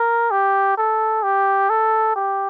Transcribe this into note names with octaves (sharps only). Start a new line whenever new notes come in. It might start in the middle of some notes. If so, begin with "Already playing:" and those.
Already playing: A#4
G4
A4
G4
A4
G4